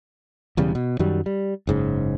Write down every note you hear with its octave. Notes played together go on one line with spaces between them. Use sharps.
E1 E2 C#3 G3
B2
F#2 D#3 F#3 G3
G3
F#1 G#2 C#3